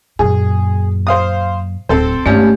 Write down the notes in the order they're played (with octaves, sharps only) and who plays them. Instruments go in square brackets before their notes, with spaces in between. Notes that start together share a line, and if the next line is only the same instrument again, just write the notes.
[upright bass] F#2 A#2 [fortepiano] G#4
[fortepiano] C5 F5 D#6
[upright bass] D1 [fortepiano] C4 A4 C5
[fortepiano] G#1 C#4 D5 [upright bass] G2 [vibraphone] A3 G4